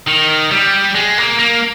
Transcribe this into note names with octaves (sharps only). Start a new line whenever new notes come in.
D#3
G3
G#3
A#3
A#3